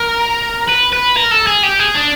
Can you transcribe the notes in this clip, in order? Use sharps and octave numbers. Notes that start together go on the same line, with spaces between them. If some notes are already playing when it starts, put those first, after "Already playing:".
Already playing: A#4
B4
B4
A#4
A4
G#4
G4
G#4
D4